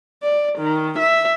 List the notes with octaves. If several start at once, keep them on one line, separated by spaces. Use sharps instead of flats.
D5
D#3
E5